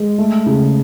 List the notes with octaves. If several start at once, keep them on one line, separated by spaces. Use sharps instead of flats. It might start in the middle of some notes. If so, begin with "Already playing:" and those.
Already playing: G#3
A3
C#3